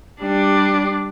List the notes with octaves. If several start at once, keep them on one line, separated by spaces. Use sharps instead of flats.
G3 D4